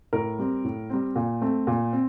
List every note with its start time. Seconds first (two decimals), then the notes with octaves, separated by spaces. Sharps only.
0.13 A2 A#4
0.39 G3 C4
0.64 A2
0.90 G3 C4
1.16 A#2
1.42 A3 C4
1.67 A#2
1.93 C4